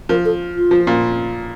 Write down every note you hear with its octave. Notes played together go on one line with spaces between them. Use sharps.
F3 A#4
A4
F4
F3
A#2